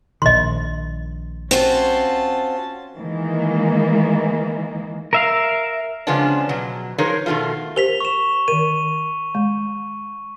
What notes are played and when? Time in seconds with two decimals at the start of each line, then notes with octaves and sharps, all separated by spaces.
0.22 A#1 A#2 D#3 D#5 C6
1.51 C4 C#4 F4 F#4 A5
2.97 D#3 E3 G#3 A#3
5.13 A#4 E5 F5
6.07 C#3 F3 G#3 B3 C#4 D4
6.49 B2 F#3
6.98 F3 D#4 G#4 A#4 B4 C#5
7.26 B2 D#3 G3 A3 F4
7.76 G4 A#4 C5 B6 F7 G7
8.01 C#6 E7
8.48 D#3 A#4 D#7
9.35 G#3